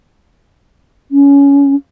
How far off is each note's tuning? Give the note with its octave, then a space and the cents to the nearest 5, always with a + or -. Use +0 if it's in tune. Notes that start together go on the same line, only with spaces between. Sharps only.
C#4 +20